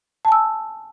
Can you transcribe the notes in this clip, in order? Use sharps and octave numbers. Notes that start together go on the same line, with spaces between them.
G#5 A5 E6